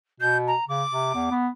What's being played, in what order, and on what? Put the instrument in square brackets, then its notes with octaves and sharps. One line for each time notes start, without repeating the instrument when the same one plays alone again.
[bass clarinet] B2 [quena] G6
[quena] A#5
[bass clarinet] C#3 [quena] D6
[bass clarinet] C3
E2
B3